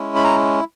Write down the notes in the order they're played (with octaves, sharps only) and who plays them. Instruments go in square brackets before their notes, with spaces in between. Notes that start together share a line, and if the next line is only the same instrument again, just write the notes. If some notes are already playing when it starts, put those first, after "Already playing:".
Already playing: [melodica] G#3 C#4 E4
B5
A#5